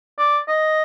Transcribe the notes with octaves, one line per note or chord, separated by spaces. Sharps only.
D5
D#5